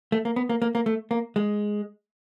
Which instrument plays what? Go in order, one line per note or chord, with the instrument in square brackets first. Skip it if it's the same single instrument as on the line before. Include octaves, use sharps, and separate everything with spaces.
[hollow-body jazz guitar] A3
A#3
B3
A#3
A#3
A#3
A3
A#3
G#3